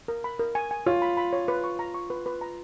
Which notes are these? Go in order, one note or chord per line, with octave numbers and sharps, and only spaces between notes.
A#4
B5
A#4
G#5
G#5
F4 C#5
B5
B5
C#5
B4
C#6
A#5
C#6
B4
B4
A#5